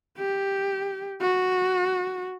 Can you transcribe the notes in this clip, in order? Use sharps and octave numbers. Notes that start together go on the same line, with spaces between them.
G4
F#4